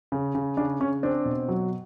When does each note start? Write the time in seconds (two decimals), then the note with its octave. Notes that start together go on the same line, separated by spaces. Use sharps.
0.12 C#3
0.35 C#3
0.57 C#3 D4
0.80 C#3 C#4
1.03 C4 D4
1.25 B2
1.48 F#3